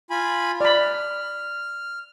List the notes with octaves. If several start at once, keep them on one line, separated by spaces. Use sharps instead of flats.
F4 G#5 B5
D5 B5 F6